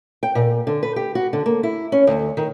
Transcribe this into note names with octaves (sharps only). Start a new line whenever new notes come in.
G5
A#2
D3
B4
G4
F#4
D3
A#3
E4
C#4
D2
D#3